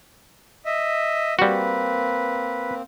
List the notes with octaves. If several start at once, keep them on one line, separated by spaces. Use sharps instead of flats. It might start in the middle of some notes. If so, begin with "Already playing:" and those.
D#5 E5
G3 A#3 C4 F#4 B4